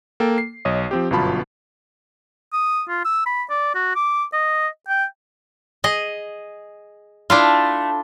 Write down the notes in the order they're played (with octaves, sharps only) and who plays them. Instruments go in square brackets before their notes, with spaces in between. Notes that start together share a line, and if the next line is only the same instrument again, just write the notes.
[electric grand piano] A#3 A4 G5
C7
B1 C#5 D#5 D#6
F3 C4 G4
G1 F#2 B2 F4 A5 B5
[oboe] D#6
F4
E6
B5
D5
F#4
D6
D#5
G5
[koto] G#4 D#5
[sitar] A3 [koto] D4 E4 F4